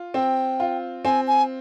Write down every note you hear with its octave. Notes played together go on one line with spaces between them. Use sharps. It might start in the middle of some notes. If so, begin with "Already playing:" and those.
Already playing: F4
C4 G5
F4
C4 G#5
G#5